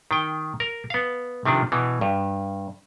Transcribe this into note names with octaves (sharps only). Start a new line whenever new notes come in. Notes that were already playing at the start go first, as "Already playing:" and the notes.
D#3 G5
A#4
B3 F5
C3 D#3 F3 D4
B2 E3
G2